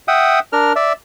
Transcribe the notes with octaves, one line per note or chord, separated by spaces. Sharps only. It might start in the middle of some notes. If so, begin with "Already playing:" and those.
E5 F#5 G5 D#6
D4 A#4 F6
D5 E5